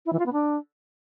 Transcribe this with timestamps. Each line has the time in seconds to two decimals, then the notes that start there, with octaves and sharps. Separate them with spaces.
0.06 E4
0.13 E3
0.19 F4
0.26 B3
0.33 D4